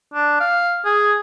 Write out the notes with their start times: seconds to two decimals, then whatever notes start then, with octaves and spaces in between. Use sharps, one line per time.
0.14 D4
0.40 F5
0.85 G#4